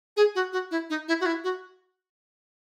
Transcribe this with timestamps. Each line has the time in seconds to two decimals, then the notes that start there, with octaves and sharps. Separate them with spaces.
0.17 G#4
0.35 F#4
0.53 F#4
0.71 E4
0.90 D#4
1.08 E4
1.21 F#4
1.26 E4
1.44 F#4